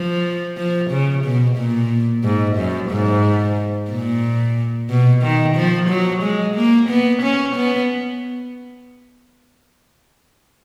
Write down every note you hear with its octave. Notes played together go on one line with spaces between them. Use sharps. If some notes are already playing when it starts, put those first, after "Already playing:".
Already playing: F3
F3
C#3
B2
A#2
G#2
F#2
G#2
A#2
B2
D#3
F3
F#3
G#3
A#3
B3
C#4
B3